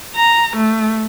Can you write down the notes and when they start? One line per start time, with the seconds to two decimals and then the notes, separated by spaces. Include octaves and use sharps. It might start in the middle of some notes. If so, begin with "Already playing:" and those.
0.16 A#5
0.57 A3